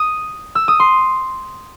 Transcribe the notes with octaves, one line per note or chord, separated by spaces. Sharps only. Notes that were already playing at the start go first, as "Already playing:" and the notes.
Already playing: D#6
E6
D#6
C6